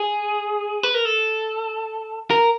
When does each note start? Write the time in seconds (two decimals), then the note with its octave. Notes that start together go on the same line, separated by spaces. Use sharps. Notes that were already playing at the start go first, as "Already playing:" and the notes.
Already playing: G#4
0.83 B4
0.94 A#4
1.05 A4
2.30 A#4